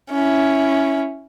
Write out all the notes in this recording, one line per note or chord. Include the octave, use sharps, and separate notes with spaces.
C#4 E4